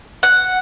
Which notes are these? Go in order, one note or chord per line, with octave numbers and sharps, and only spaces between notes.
F#5